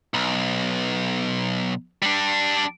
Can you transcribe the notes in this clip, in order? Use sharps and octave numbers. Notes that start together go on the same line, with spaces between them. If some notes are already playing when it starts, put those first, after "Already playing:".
B1
G3 D4